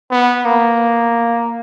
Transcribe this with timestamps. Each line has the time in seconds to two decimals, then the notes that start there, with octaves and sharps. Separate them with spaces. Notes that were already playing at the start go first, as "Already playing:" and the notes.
0.11 B3
0.45 A#3